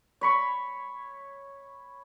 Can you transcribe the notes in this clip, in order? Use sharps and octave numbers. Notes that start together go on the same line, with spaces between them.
C#5 B5 C#6